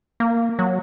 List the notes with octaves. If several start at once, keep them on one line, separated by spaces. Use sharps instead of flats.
A#3
F#3